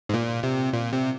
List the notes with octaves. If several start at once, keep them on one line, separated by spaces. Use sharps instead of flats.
G#2
A#2
C3
A#2
C3